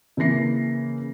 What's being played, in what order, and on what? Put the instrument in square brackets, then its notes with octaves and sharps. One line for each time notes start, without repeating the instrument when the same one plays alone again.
[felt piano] C#3 E3 A#3 A#6 C7